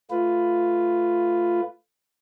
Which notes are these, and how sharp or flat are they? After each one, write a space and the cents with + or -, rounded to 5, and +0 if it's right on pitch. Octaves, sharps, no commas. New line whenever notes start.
A3 +0 F4 +0 B4 +10